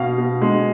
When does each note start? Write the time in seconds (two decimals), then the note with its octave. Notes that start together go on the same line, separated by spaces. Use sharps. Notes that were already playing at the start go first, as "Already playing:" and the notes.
Already playing: B2 F5
0.18 B2
0.41 G#3